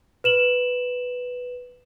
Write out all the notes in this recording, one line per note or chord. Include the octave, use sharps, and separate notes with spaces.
B4 E7 F#7